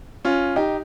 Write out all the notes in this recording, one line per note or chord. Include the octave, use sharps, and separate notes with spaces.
C#4 F4
D#4 G4